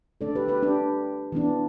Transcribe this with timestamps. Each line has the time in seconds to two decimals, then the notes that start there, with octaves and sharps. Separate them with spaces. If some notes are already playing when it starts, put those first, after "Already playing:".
0.21 D3 A3 D4 A4 D5
0.35 G4 B4
0.48 G4 B4
0.63 D4 G4
1.32 E3 B3 D4